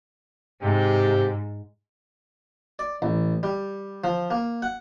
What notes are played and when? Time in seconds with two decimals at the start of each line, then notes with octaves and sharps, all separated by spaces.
0.61 G#2 C3 G4
2.79 D5
3.02 A1
3.43 G3
4.04 F3
4.30 A#3
4.62 F#5